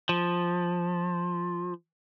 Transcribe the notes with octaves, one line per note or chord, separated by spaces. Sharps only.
F3